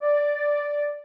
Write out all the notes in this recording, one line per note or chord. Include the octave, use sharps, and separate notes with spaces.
D5